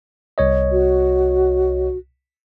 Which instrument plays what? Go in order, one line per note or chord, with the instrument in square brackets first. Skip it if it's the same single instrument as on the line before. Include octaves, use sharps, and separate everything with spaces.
[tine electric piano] C2 C#5 D#5
[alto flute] F#4